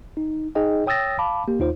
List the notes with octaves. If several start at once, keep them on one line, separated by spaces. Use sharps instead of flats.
D#4
D#4 G#4 D#5 G5
C#5 G5 D#6 E6 A6 A#6
F5 A5 B5 D6
A#3 G4
D#2 D#4 F4 C5